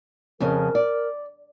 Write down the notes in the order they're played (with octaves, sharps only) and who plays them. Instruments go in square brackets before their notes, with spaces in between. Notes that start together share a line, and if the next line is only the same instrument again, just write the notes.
[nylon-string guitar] F2 C#3 C#4 [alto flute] A#4
[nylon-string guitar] D5